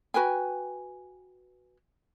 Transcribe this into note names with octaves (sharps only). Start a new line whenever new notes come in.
F#4 B4 G5 G#5